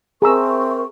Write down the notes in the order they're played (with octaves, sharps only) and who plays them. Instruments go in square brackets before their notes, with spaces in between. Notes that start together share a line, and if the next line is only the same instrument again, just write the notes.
[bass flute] C4 [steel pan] G#4 A#5 E6 [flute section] A#4 E5 C#6